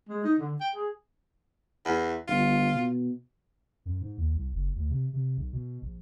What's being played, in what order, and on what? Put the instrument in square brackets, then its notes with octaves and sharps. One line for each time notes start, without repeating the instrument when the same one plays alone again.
[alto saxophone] G#3
D#4
D3
G5
G#4
[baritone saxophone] E2
[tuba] G1 [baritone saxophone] F4
[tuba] B2
[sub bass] F#2
G#2
D#2
C2
F#1
D2
C3
C3
B1
B2
A#1